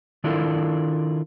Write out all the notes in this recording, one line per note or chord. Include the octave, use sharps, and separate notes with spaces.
D#3 D4 E4 F4 A4 A#4